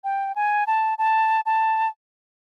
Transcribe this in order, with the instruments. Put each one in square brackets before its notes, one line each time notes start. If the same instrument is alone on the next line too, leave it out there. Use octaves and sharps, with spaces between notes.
[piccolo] G5
G#5
A5
A5
A5